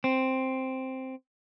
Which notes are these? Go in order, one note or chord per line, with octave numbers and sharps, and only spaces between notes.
C4